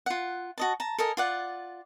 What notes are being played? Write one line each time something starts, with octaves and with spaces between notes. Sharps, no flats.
F4 F#5
F#4 D#5 A5
A5 A#5
A4 A#4 D#5 G#5
F4 D5 F#5